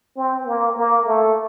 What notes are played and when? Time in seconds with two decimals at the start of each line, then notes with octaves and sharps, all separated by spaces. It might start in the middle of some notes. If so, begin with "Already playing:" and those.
0.16 C4
0.47 A#3
0.76 A#3
1.06 A3